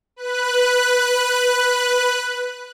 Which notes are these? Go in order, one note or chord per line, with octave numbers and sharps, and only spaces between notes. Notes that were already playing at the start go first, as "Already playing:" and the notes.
B4 F#6